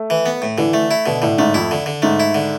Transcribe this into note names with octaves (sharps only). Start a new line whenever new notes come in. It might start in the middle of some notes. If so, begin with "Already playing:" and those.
Already playing: A3
E3
B3
A2
D3 E3
A3
E4
B2 D3
A2 D3
G#2 A3
F2 E4
D3
D3
G#2 A3
E4
D3